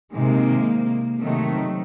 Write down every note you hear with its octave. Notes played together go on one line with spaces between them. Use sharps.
C3 D#3 G#3 A#3
C3 D#3 F#3 A3